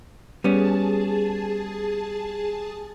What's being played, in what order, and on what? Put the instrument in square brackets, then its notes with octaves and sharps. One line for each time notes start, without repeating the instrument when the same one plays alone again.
[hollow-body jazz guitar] G3 B3 C#4 [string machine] G#4 A5